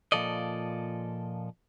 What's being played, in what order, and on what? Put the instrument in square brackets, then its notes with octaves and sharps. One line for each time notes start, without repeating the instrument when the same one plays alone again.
[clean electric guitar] A#2 E3 F3 A4 D5 D#5